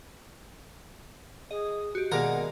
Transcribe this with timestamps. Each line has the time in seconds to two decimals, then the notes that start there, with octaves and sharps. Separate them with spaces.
1.51 G#4 D#5
1.95 F#4 G4
2.12 B2 D#3 G#3 A#3 A#4 D5 F#5 A#5